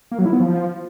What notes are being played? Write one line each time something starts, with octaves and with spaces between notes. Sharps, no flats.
A#3
F#3
E4
B3
F3